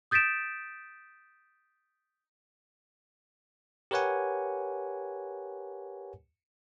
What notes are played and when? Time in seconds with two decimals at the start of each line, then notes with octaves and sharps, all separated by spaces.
0.11 D#6 G6 A6 B6 D7 E7
3.91 G4 A#4 B4 C#5 F#5 G#5